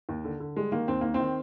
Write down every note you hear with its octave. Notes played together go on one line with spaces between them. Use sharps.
D#2
D3
D3
G3 G#3
D#3 A#3
D#2 C4
D#3 A#3
C4
D#3